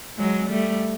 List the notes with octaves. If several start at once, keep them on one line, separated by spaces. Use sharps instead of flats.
F#3 G#3
G3 A3